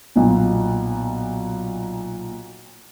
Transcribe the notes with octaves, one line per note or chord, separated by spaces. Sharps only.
B1 A#2